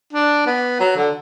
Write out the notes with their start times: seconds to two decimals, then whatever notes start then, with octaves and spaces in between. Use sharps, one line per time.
0.13 D4
0.46 B3
0.80 F#3
0.96 D3